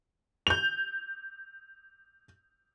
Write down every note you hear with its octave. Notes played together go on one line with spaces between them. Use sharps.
G6 F7